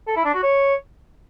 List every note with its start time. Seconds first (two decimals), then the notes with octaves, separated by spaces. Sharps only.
0.07 A4
0.16 E4
0.25 D4
0.34 F#4
0.43 C#5